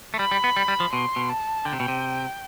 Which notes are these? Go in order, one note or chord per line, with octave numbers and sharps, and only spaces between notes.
A3
G3 B5
G3
B3
G3
G3
F3
B2 C6
B2
A5
D3 G5
C3
B2
C3